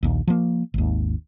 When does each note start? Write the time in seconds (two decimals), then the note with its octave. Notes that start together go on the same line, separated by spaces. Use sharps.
0.03 A#1 D#2
0.28 F3 A#3
0.74 G#1 D#2